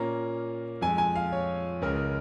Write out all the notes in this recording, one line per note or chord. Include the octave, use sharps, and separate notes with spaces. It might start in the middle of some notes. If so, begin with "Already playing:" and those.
Already playing: A#2 A#3 C#4 A#5
F2 F3 G#3 G#5
G#5
F5
C#5
C#2 C#3 G#3 C#4 A#4